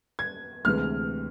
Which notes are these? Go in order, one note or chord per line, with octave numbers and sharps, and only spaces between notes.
G#6
D2 C3 E3 G#3 F6